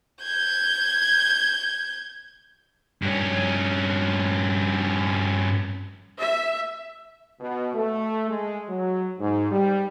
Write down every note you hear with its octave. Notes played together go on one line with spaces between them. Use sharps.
G6 G#6
G2 C#4
E5
B2
A3
G#3
F#3
G#2
G3